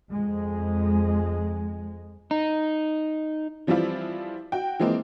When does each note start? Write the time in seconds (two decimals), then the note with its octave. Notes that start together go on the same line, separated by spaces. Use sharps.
0.10 F2 G#3
2.31 D#4
3.67 E3 F3 G3 C4 E4 F4
4.52 F#4 G5
4.79 E3 F3 G#3 A#3 C4